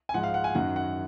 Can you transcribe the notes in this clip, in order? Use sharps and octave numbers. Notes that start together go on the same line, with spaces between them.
G#5
G#2 F3 G#3 F#5
F5
F#5
G#5
F#2 D#3 F#3 F#5
F#5